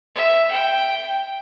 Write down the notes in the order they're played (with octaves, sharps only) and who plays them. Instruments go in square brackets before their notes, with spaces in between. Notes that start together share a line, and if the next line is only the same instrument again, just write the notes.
[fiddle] E5
G5